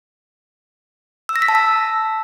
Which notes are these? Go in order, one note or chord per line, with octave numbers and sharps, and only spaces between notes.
E6
A#6
B6
A5
E6